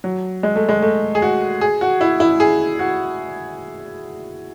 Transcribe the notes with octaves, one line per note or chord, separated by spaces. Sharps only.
F#3
G#3
A3
G#3
A3
G#4
F#4
G#4
F#4
E4
E4
G#4
F#4